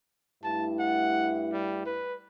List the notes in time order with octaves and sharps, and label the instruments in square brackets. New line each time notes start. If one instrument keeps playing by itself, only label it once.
[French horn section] G2 A3 E4 [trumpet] A5
[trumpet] F#5
G3
B4